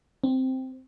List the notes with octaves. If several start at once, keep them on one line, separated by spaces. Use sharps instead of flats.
C4